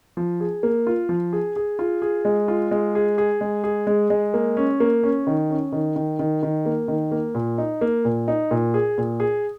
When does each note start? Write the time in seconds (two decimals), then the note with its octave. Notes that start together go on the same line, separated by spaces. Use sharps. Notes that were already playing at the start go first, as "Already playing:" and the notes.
0.17 F3
0.40 G#4
0.63 A#3
0.87 F4
1.09 F3
1.33 G#4
1.56 G#4
1.79 F4
2.02 G#4
2.25 G#3
2.48 F4
2.71 G#3
2.95 G#4
3.18 G#4
3.41 G#3
3.64 G#4
3.87 G#3
4.10 G#3
4.34 A#3
4.57 C#4
4.80 A#3
5.03 C#4
5.27 D#3
5.50 C#4
5.72 D#3
5.96 D#3
6.19 D#3
6.43 D#3
6.66 A#3
6.88 D#3
7.12 A#3
7.35 A#2
7.58 D#4
7.81 A#3
8.05 A#2
8.28 D#4
8.51 A#2
8.74 G#4
8.98 A#2
9.20 G#4